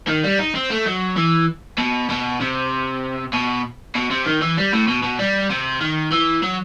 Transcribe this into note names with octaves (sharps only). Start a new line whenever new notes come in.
D#3
G3
D#4
C4
A3
F#3
E3
B2
B2
C3
B2
B2
C3
D#3
E3
G3
A2
B2
B2
G3
C3
D#3
E3
F#3